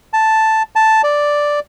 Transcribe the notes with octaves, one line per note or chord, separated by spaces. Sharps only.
A5
A5
D5